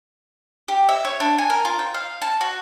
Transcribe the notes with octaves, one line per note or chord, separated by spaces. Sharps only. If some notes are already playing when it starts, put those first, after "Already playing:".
G4
E5
C#5
D4
G#5
A#4
F4
G5
F5
A5
F#4